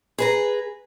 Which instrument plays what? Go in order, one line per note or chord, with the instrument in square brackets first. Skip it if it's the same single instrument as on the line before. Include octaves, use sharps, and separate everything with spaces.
[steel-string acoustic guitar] G#4 B4 A#5